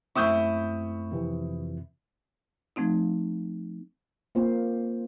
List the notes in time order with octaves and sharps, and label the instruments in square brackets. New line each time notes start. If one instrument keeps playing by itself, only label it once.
[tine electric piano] F#2 A3 C4 [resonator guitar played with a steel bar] E4 [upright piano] C#6 D#6 G6
[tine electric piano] F2 C3 E3
[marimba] F3 A3 C4 D#4
[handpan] A#3 C4 F4 C5